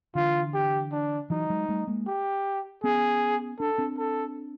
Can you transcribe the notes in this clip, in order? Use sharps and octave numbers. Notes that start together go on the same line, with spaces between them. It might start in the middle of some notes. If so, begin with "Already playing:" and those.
D3 E3 F4
G4
D4
E3 F#3 D#4
F#3 G#3
G3 A3
G#3 A#3
G4
B3 C#4 G#4
D4 A4
C4 D4
A4